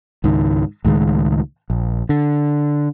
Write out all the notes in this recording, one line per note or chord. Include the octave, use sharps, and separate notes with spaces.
C#2 G#2 D#3
C#2 A2 D#3 G#3
A#1
D3